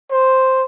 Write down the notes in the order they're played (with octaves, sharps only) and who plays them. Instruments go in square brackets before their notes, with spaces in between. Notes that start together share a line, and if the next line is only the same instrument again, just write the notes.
[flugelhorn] C5